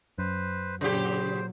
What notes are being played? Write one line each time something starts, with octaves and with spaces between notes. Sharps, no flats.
F#2 B4 C5
A#2 C#3 F#3 G4 C5